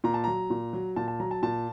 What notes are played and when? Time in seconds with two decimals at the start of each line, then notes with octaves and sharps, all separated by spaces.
0.04 A#2 A#5
0.14 A5
0.24 F#3 A#5
0.50 A#2
0.73 F#3
0.96 A#2 A5
1.08 A5
1.20 F#3 A#5
1.31 A5
1.43 A#2 A5